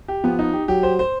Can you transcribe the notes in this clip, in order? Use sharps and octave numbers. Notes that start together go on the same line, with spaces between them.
G4
F3 B3
D#4
G4
F#3 G4
C5
C5